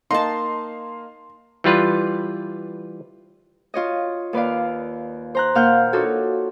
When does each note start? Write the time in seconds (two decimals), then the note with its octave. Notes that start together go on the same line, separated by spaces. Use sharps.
0.11 A#3 D#4 D#5 F5 A5 C6
1.64 E3 G3 F4 B4
3.74 F4 C#5 D#5
4.33 D#2 B4 D5 F5
5.35 C5 A#5 F#6
5.55 A#2 F5 F#5 F6 G6
5.93 D4 D#4 F4 F#4 A4 C#5